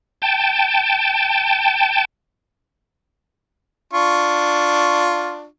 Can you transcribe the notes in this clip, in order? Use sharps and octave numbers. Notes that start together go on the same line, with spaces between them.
G5 A5
D4 F4 C#6